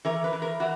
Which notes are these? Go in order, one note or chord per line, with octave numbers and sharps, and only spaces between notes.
E3 A#4
B4
E3
A#4
E3 F#4